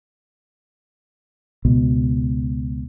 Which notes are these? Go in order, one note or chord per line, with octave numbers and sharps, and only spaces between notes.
C#2 B2